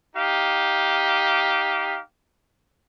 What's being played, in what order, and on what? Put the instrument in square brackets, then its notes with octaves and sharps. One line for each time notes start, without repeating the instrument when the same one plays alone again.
[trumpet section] D#4 G4 F5